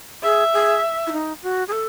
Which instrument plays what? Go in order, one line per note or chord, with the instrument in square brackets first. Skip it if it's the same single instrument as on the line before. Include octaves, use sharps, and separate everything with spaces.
[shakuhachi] G#4 [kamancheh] E5
[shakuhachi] G#4
E4
D#4
F#4
G#4
A4